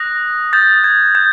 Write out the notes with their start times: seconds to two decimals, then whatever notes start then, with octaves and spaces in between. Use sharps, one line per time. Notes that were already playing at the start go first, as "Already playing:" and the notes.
Already playing: D#6 F#6 A#6
0.53 D#6 G6 A6
0.74 A6
0.84 G#6
1.15 G6